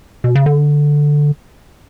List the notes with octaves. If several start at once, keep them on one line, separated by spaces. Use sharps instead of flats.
B2
C#3
D3